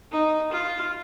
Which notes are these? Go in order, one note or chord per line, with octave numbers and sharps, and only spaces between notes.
D#4
F4